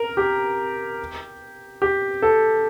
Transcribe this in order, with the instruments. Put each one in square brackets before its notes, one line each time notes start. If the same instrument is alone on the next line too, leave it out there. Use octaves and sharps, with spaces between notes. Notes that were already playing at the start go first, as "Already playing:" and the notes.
Already playing: [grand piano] A#4
G4
G4
A4